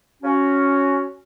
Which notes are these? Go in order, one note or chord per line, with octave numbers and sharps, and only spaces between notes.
C#4 F#4